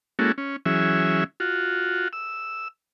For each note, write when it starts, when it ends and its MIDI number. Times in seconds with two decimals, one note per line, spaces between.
0.19 0.32 56
0.19 0.32 58
0.19 0.32 61
0.19 0.32 64
0.19 0.32 66
0.19 0.32 69
0.38 0.56 61
0.66 1.24 52
0.66 1.24 54
0.66 1.24 61
0.66 1.24 68
0.66 1.24 76
1.40 2.08 65
1.40 2.08 66
2.13 2.68 88